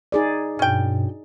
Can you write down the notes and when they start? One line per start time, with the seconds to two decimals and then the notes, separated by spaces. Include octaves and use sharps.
0.12 D#4 G#4 D5
0.59 G2 B2 C#4 G5